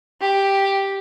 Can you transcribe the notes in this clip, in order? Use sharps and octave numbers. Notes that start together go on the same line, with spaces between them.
G4